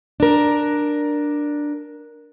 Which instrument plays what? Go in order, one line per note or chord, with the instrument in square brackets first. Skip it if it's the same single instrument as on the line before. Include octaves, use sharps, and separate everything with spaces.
[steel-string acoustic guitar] D4 A#4